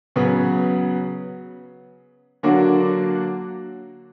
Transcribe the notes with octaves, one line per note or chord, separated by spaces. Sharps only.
C#3 F#3 B3
D3 F#3 A#3 D4 F#4